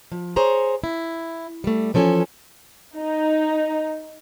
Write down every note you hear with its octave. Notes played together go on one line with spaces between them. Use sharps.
F3
G#4 C5 C#5 A#5
E4
G3 A3
E3 F3 C#4 A4 G#5
D#4